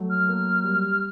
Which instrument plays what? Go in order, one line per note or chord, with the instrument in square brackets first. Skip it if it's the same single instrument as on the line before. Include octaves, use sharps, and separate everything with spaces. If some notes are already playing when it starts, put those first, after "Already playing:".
Already playing: [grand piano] F#3 A3
[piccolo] F6
[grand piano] A#3
G3